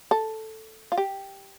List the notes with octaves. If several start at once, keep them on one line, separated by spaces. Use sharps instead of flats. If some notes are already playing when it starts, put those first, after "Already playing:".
A4
F4
G4